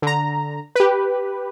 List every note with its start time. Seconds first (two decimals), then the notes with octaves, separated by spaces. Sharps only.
0.02 D3 A#5
0.75 G4 B4